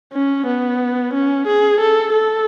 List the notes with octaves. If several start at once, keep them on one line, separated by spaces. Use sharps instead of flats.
C#4
B3
C#4
G#4
A4
A4